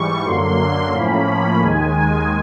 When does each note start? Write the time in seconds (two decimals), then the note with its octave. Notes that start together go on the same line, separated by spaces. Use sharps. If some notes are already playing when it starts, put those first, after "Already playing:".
Already playing: G#2 E3 G3 C#6
0.25 F#2 D3 F#3 A#3 C6
0.93 A2 F3 A#3 C#4 B5
1.61 D#2 D#3 G#3 G#5